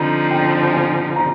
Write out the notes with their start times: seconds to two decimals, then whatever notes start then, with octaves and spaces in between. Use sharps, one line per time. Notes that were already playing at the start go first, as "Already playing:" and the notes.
Already playing: D3 F3 C4 D#4 A#5
0.31 G5
0.73 G#5
1.16 A#5